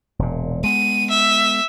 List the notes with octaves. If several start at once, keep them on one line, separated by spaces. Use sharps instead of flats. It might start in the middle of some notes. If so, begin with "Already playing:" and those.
E1 A#2
G#3 B3 D#7
E5